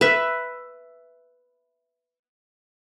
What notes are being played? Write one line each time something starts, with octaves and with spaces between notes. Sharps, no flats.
B4 E5